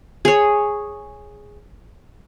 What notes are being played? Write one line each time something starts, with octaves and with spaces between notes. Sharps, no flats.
G#4 C#5